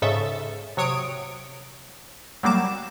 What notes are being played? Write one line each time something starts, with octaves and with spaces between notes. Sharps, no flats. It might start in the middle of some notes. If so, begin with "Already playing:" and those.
G#2 C#3 A4 E5
C3 F#3 C#5 D#6 D7
F#3 G3 A#3 D6 E7